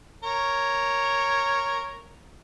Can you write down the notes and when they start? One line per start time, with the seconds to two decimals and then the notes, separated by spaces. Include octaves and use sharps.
0.23 A#4 C#5